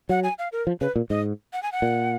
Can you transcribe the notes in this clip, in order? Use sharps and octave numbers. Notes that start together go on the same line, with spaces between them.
F#3 F#5
G#5
F5
A#4
F3
C#3 B4
A#2
G#2 D#5
F#5
G#5
F#5
A#2